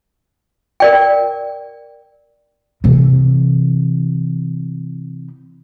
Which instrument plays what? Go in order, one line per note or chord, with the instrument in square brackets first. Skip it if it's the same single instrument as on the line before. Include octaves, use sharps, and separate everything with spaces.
[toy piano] A#4 D5 G5
[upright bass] C3 E3